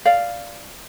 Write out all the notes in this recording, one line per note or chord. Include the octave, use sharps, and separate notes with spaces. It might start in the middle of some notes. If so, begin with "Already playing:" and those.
D5 F5